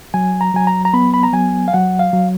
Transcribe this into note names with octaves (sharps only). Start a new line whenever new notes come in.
F#3 G#5
A#5
F#3 G#5
A#5
A#5
B3 B5
B5
A#5
F#3 G#5
F5
F#3 F#5
F5
F#3